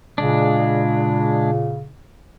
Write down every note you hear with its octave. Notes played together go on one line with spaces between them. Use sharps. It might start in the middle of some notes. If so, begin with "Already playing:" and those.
A#2 C#3 G#3 D4